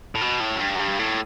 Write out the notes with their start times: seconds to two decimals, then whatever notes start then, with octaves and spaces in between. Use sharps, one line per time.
0.15 A2
0.21 B2
0.40 A2
0.56 F#2
0.60 G2
0.75 F#2
0.79 G2
0.99 A2